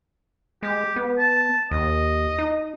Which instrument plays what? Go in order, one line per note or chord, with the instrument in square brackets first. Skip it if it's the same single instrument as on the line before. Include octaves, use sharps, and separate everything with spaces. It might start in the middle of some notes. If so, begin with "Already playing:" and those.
[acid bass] G#3 [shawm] G4
[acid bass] B3
[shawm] A5
[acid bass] D#2 [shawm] D#5
[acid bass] D#4